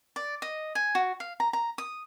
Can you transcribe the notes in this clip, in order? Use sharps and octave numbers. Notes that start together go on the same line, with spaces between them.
D5
D#5
G#5
F#4
F5
A#5
A#5
D#6